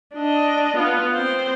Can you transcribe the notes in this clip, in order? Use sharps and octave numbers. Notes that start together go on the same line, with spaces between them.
D4 D#5
B3 F4
C4 C5